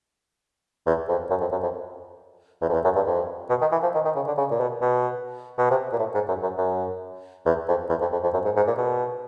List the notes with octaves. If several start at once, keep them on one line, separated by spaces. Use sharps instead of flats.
E2
F2
F#2
F2
F#2
F2
E2
F2
E2
F#2
G2
F2
B2
D#3
E3
F3
D#3
D#3
C#3
D3
C#3
A#2
B2
B2
B2
C3
A#2
A2
G#2
F#2
F#2
F#2
E2
F2
E2
F2
F2
F2
F#2
G#2
G#2
A#2
B2